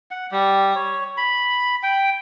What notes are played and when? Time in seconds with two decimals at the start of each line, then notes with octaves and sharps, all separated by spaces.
0.11 F#5
0.32 G3
0.75 C#5
1.17 B5
1.83 G5